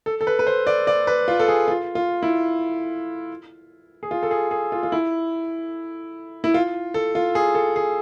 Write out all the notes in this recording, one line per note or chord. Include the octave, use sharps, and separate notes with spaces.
A4
A4
B4
B4
C5
D5
D5
B4
F4
A4
G#4
F4
F4
E4
G#4
F4
A4
G#4
G#4
F4
F4
E4
E4
F4
A4
F4
G#4
A4
G#4